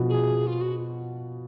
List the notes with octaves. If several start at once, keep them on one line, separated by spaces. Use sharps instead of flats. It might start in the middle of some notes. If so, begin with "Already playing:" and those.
Already playing: B2 F3
G#4
F4
F#4